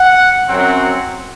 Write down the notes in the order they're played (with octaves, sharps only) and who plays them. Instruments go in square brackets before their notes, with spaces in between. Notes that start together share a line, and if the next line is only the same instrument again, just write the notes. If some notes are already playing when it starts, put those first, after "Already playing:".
Already playing: [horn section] F#5
F#2 F#3 C4 F#5